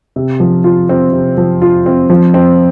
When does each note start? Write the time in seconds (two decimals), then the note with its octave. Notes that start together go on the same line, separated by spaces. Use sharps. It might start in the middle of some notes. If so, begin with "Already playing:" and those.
0.16 C3
0.40 F3
0.64 F4
0.89 C4
1.13 C3
1.37 F3
1.62 F4
1.86 C4
2.10 F3
2.34 C4